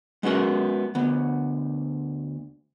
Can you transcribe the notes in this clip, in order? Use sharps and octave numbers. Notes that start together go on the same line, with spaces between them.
G#3 B3 C#4 F#4 A#4
D2 B3